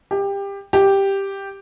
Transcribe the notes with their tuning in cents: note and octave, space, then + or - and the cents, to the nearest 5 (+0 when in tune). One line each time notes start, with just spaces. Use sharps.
G4 +20
G4 +0